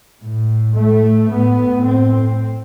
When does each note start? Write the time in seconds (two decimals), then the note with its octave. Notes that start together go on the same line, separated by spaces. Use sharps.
0.21 A2
0.74 A3
1.29 A2 B3
1.83 C4